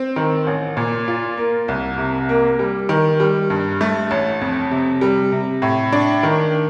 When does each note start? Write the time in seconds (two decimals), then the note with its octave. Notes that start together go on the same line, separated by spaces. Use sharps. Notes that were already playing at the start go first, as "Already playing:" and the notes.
Already playing: C4
0.16 D#3
0.47 A1
0.77 A#2
1.08 F4
1.37 A#3
1.68 C2
1.98 C3
2.29 A#3
2.59 G3
2.89 D#3
3.20 G3
3.50 G2
3.81 A3
4.11 A1
4.41 F2
4.71 C3
5.01 G3
5.32 C3
5.62 A2
5.92 D4
6.23 D#3